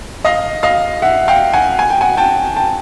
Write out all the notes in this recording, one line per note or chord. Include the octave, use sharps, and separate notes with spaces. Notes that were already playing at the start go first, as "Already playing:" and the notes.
D#5 F5
D#5 F5
E5 F#5
F5 G5
F#5 G#5
G#5
G5
F#5 G#5
G5 A5
G5 A5